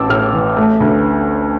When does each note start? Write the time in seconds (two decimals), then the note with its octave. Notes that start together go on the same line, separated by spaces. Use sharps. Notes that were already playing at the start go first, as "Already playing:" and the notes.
Already playing: A1 A5 D6 E6
0.09 A2 F6
0.33 E3
0.56 A3
0.80 D2